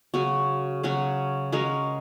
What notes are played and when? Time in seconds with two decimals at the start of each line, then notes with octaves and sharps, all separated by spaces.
0.14 C#3 F#3 C#4 F#4
0.83 C#3 F#3 C#4 F#4
1.52 G#3 C#4 F#4 A#4